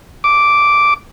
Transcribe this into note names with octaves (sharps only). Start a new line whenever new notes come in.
D6